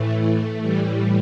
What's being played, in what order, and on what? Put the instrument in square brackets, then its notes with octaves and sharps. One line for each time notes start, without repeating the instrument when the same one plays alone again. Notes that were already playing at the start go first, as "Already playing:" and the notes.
Already playing: [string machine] A2 E3 A3
A2 E3 G3